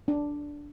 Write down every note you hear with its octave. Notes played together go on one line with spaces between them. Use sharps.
D4